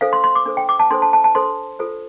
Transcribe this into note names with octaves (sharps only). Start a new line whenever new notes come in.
D4 A4 C5 F5
C6
C6
D6
D4 A4 C5
G5
D6
A5
D4 A4 C5 C6
A5
A5
A5
D4 A4 C5 C6
F4 A4 C5